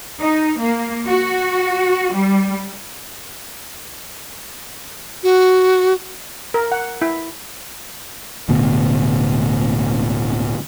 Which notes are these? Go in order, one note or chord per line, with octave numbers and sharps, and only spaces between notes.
D#4
A#3
F#4
G3
F#4
A#4
F#5
E4
D1 D2 B2